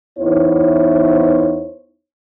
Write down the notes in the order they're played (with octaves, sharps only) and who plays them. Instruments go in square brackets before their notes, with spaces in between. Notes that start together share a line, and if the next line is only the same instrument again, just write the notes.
[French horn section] E2 B3 D#4 E4 C5 C#5